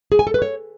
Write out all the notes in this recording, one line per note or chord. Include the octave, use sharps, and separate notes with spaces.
G#4
G#5
A4
B4
C#5